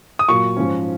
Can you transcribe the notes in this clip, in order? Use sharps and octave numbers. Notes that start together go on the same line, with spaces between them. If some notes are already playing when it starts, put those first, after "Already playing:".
D#6
A#2 F#3 A#3 C#6
G#2 F3 G#3 C#4